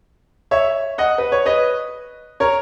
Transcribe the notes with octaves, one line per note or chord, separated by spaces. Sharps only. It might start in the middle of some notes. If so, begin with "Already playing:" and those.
C#5 E5
D#5 F#5
B4
C#5
B4 D#5
A#4 C#5